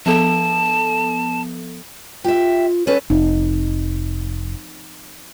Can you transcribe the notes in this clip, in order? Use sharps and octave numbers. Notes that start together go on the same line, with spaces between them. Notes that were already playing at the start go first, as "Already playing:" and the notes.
F3 B3 A4 A5
F4 G4 E5
C#4 A4 B4 C#5
F1 F3 C4 D#4